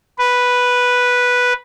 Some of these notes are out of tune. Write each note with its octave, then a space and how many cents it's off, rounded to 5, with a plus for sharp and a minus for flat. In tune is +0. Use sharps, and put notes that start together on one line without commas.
B4 -5